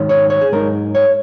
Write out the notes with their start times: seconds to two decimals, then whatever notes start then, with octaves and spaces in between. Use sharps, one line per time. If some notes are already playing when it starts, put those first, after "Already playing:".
Already playing: G#2 D#3 F#3 C#4
0.09 C#5
0.30 C#5
0.41 G#4
0.52 G#2 F#3 D#4 A#4
0.95 C#5